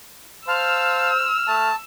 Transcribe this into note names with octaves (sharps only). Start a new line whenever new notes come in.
C5 F5 A5 E6 F6
A3 A5